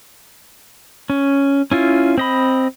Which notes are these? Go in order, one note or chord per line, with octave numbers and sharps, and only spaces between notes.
C#4
C#4 E4 F4
C4 D#5 B5